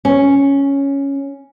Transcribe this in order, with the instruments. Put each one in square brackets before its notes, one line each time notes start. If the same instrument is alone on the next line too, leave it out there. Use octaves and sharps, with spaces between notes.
[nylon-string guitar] C#4